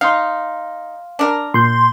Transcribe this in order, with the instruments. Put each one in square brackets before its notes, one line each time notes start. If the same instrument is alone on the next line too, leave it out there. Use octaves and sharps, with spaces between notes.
[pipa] D#4 [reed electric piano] F5 C6
[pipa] D4 A#4
[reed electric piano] A#2 G6 [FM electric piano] C6